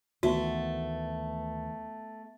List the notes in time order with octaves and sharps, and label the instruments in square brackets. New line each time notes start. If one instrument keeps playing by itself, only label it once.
[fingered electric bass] D2 D#3 E3 [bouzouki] A3 [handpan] B3 [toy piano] F#4